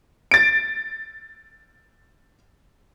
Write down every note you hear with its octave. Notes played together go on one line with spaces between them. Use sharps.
A6 D7